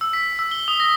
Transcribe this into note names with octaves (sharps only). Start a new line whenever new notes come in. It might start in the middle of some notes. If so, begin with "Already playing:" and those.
E6
B6
E6
G7
D#6
A#6